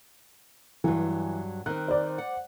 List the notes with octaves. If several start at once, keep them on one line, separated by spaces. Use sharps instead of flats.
G2 E3 F#3
D#3 C4 F#6
C5 D5
F#5